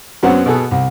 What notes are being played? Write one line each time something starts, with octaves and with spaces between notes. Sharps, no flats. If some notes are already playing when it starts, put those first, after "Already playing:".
F#2 F#3 B3 C4 B4 F#5
B2 B3 G#4 A4
C2